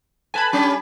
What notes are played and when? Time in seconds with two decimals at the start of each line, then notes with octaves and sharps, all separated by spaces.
0.34 A4 B4 G#5 A5 B5
0.53 G3 C#4 G4